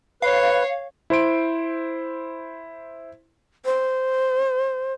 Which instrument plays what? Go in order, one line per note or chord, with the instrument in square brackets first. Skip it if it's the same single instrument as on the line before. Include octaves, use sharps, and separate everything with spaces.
[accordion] B4 [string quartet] C#5 [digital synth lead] F5
[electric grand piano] E4 C5 C6 D7
[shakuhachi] C5